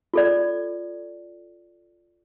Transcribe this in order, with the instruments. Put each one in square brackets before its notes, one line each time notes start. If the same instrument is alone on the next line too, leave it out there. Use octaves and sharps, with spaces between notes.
[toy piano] F4 A4 D5